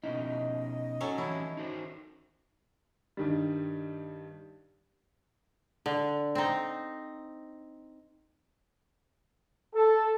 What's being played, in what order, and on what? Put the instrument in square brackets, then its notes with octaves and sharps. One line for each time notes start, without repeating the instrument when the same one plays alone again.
[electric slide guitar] B2 C#4 E4 [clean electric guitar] D#4 [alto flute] D#5
[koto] F#3 C#4 A4
[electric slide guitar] E3 F#3 C#4 [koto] E4
[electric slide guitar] D#4 F#4 C5
[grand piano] G2 D#3 G3
[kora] D3
C4 D#4
[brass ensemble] A4